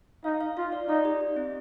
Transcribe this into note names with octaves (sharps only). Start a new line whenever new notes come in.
D#4 F5
F5
F4 F5
D5
D#4 D5
G4
G4
C4